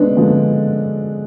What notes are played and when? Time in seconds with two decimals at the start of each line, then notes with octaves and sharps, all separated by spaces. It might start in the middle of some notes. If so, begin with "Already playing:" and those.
Already playing: D3 G#3 B3 D4
0.17 D3 F3 G#3